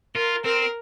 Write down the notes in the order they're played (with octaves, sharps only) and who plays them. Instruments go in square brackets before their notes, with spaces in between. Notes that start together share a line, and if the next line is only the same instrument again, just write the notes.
[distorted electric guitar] F4 [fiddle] A#4
[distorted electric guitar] C4 [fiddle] A#4